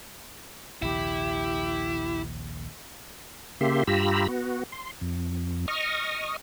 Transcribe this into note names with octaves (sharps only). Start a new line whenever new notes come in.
A#1 D#2 C3 E4 G4
C#3 A#3 G4 E5 C6
G2 F4 G4 A#5 B5 E6
B3 F#4
C6
F2
D#5 C#6 D#6 F6